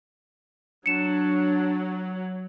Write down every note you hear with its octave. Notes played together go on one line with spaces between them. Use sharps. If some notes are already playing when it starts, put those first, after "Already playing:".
F#3 D4 C#7 E7